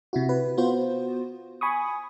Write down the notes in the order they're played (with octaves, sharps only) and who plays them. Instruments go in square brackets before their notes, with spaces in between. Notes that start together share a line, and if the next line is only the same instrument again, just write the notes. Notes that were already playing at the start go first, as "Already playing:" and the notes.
[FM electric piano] C3 E4 F#4
B4
B3 F4 F#4 C5
G#5 B5 C#6 D#6